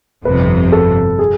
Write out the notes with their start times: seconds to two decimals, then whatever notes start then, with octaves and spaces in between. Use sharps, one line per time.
0.25 G1 F2 C3 B4
0.72 A4
1.19 G#4